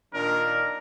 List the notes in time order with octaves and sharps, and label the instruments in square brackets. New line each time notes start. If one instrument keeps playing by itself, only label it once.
[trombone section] A#2 D#3 D4 [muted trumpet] A#4